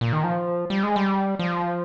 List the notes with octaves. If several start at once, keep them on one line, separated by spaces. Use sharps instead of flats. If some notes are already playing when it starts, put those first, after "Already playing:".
A#2
D#3
F3
G3
G#3
G3
F3